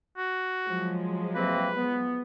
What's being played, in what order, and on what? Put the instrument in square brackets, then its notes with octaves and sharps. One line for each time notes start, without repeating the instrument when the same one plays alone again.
[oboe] F#4
[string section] F3 F#3 G#3
[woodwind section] C3 A#3 C4 [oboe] B4
[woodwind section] B3